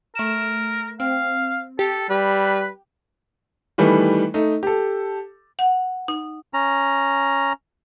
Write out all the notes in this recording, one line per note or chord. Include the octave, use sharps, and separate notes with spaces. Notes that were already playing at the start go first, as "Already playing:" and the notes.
A3 A#4 E7
C4 F5
G4 A4
G3 B4
D#3 E3 G3 A3 B4
A3 D#4
G4 A4
F#5
D#4
C#4 A#5